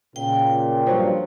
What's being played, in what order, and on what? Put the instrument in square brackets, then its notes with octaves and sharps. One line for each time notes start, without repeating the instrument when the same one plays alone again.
[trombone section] A#2 [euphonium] C#3 [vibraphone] G5
[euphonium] G2 [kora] F3 F#3 F#4